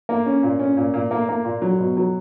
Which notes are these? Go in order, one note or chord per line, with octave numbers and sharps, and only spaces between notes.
A#3
C#4
A#2
C#4
A#2
A#2
A#3
A#3
A#2
F#3
B2
F#3